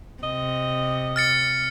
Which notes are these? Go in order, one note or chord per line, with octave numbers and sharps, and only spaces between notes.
C3 D#5
F6 A6 C#7